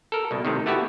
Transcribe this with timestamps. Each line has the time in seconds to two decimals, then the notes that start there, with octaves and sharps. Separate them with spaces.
0.12 A4 A#4
0.31 C2 B2
0.45 A2 C3 D#3
0.66 A3 B3 E4 F#4 G4